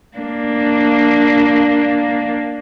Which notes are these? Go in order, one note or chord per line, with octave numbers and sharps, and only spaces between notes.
A#3 D4